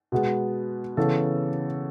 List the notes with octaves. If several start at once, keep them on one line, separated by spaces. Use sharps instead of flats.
B2 G#3 B3
C#3 E3 B3 A4